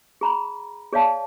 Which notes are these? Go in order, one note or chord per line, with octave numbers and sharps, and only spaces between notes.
G#4 A#5 B5
G#4 C#5 D5 F5 A5